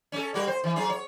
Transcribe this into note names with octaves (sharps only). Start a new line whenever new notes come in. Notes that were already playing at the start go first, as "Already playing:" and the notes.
C#4 A4
G3 F#4 A#4
C5
E3
F#3 F4 G#4
C#5